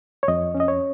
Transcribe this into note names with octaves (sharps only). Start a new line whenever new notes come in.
C#5
F2 D#5
C#4
D#5
C#5